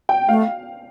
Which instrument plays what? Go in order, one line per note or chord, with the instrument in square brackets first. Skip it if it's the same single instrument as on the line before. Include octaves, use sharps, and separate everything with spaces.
[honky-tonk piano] G5
[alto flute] A3 [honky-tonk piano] F5